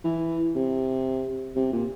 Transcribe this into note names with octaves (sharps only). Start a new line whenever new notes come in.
E3
C3
C3
A#2